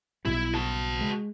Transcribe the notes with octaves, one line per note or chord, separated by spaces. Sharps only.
B1 B2 G3 E4
F#4 A5
G#3